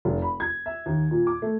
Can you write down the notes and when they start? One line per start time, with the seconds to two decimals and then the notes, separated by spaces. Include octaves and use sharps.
0.05 F1
0.22 B5
0.40 G#6
0.66 E5
0.86 D#2
1.11 A#2
1.27 D6
1.42 A3